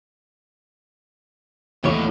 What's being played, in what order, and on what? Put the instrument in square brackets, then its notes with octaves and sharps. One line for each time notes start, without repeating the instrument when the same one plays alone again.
[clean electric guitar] D#2 E3 C#5 [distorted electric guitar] A2 D3